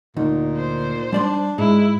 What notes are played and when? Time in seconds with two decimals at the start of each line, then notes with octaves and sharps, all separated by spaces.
0.17 D2 A#2 D#4
0.56 C5
1.12 G3 D4 D5 C6
1.58 G#2 G#3 E4